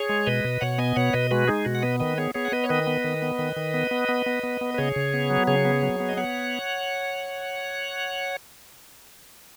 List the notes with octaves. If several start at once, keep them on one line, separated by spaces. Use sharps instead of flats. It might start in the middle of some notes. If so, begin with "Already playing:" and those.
Already playing: G#4 C#5
G#3
B2 B4 D#5
B2
B2 C#5 F#5
B3 D#5 G#5
B2 C#5 F#5
B2 B4 D#5
G#3 F#4 B4
G#3 D#4 G#4
B2 F#4
F#5
B3 B4 D#5
D#3 B4 D#5
B3 G#4 C#5
B3 G#4 C#5
F#5
B3 B4 D#5
C#5
D#3 B4 D#5
B3
D#3
B3
D#3
D#3
B3
B3
B3
B3
B3
B3
B4
C#3 G#4 C#5
C#3
B3
F#3
C#3 G#4 C#5
B3
F#3
B3
D#5
B3 C#5 F#5